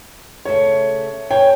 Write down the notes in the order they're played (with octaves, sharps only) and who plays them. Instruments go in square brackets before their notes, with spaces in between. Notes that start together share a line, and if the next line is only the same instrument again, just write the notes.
[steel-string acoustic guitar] C#3 A3 [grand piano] C#5
[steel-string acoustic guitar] G2 C#5 G#5 [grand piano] G5